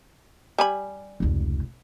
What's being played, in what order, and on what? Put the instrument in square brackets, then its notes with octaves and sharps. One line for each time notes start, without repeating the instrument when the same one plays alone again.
[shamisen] G3 G#5 B5
[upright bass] F1 C#2